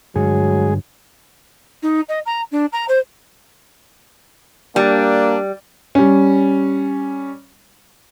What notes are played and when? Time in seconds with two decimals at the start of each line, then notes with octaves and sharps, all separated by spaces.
0.16 G2 D3 F#3 G#3 G#4
1.82 D#4
2.08 D#5
2.26 A#5
2.51 D4
2.72 A#5
2.88 C5
4.76 G3 A#3 D4
5.95 G3 C#4